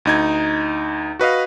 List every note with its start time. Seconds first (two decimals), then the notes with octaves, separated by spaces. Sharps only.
0.05 D2 D#4 G#6
1.19 F#4 B4 D#5 F5